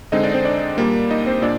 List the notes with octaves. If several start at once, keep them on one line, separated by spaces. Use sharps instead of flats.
D3 G#3 C4 D#4 D#5
D4 D5
C4 C5
D4 D5
A#2 G3 A#3
D#4 D#5
C4 C5
A#2 D4 D5